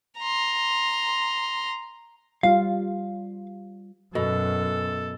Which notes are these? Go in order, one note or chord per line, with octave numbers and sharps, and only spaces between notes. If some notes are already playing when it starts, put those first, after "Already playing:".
A#5 C6
G3 F4 F5
F#2 B2 A4